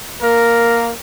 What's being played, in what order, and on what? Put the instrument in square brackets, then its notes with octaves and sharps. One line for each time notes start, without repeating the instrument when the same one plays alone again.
[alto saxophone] A#3 [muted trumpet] A#4